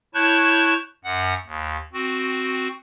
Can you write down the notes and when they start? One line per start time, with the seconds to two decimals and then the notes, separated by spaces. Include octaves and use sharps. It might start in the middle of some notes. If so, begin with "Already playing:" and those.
0.14 E4 C#5 A5 C#6 F#6 G6
1.04 F#2 F#5
1.46 D#2
1.93 C4 F#4